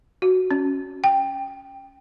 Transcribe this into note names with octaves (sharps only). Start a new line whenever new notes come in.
F#4
C#4
G5